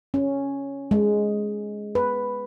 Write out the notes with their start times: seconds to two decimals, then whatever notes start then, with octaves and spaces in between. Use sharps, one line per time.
0.14 C#4
0.91 G#3
1.95 B4